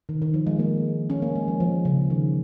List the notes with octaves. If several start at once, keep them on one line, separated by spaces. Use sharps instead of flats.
D#3
D#3
F3
G#3
A#3
C#4
A#3
G#3
F3
F3
C#3
D#3